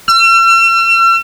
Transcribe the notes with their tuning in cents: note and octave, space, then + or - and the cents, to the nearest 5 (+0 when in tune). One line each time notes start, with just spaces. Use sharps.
E6 +45